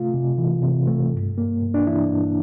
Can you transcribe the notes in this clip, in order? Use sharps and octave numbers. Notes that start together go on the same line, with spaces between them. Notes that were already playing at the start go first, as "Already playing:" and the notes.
Already playing: C3 A3 F4
C3
E3
C3
A3
G2
A#3
G2
D4
E3 E4
G2